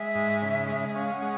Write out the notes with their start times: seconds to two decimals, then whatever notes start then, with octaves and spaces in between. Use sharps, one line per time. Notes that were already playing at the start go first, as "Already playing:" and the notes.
Already playing: G#3 E5
0.15 G#2
0.42 C#3
0.68 G#3
0.96 C#4 F5
1.13 F#5
1.22 G#3